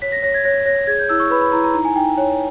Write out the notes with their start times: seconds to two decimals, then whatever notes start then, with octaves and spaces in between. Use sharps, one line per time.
0.02 C#5 B6
0.12 A#6
0.23 C#5 A#6
0.34 G#6
0.44 C#5 A#6
0.66 C#5 A#6
0.87 G#4 G#6
0.99 G6
1.09 E4 E6
1.20 C#6
1.30 B4 B5
1.41 B5
1.52 E4 A#5
1.64 A#5
1.74 D#4 A#5
1.85 G#5
1.96 D#4 G5
2.18 C#5